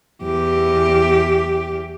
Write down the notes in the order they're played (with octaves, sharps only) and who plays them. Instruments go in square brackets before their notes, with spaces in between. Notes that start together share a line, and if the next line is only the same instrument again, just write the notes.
[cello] E2 G4